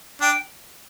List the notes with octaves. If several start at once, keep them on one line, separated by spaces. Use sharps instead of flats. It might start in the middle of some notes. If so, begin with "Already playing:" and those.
D4 G5